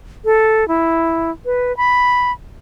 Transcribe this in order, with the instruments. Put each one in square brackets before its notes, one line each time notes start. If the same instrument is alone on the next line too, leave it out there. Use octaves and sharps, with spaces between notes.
[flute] A4
E4
B4
B5